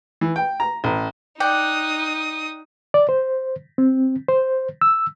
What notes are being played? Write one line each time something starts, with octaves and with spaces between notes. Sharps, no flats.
E3
G5
A#5
A1
D#4 D5 F#5 G5 D#6
D5
C5
C4
C5
E6